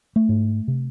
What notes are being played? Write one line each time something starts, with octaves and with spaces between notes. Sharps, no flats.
A3
G#2
C3